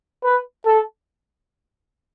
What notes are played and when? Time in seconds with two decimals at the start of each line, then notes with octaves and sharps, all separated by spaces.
0.24 B4
0.66 A4